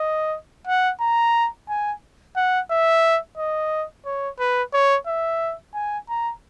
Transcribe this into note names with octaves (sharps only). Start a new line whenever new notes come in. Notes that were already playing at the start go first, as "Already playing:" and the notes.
Already playing: D#5
F#5
A#5
G#5
F#5
E5
D#5
C#5
B4
C#5
E5
G#5
A#5